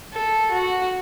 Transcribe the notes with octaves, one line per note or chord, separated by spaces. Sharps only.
A4
F#4